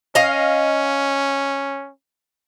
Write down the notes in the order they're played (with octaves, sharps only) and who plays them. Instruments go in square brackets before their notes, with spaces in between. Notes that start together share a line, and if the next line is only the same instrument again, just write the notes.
[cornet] C#4 [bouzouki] D#5 F5